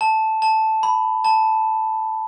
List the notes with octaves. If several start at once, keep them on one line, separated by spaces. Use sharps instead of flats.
A5
A5
B5
A5